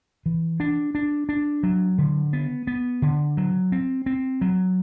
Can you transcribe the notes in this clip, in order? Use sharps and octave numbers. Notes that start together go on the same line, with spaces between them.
E3
D4
D4
D4
F#3
D3
B3
B3
D3
F#3
C4
C4
F#3